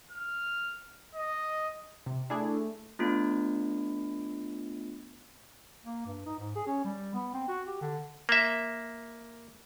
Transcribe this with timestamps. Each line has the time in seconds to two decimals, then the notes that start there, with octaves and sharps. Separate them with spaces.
0.11 F6
1.15 D#5
2.06 C3
2.30 A3 D4 E4 G#4
2.99 A3 B3 D4 F4
5.84 A#3
6.06 G2
6.26 D#4
6.39 G#2
6.56 G#4
6.67 C#4
6.84 G3
7.14 B3
7.34 C4
7.48 F#4
7.67 G4
7.81 D3
8.29 A#3 E5